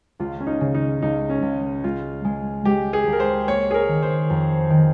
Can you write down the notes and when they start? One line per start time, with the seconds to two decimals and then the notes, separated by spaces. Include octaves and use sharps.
0.19 C#2 F4
0.40 C#4
0.47 D#4
0.61 C#3
0.75 D#4
1.02 C#2 D#4
1.29 C#4
1.42 C#2
1.84 G#3 F4
2.25 G#3
2.65 G#3 G4
2.93 G#4
3.07 C#2
3.13 A#4
3.20 C5
3.48 A#3 C#5
3.71 G#4
3.74 A#4
3.88 D#3
4.03 C5
4.30 F2
4.70 D#3